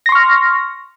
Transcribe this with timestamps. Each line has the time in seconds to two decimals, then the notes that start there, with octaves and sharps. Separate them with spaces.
0.06 A#6
0.09 C6
0.12 C#6
0.15 F6